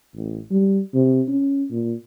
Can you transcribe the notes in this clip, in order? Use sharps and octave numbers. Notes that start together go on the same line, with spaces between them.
A1
G3
C3
C#4
A#2